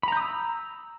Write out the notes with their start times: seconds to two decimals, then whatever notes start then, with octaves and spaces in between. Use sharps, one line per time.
0.03 B5
0.08 A#5
0.12 G6
0.17 D#6
0.21 E6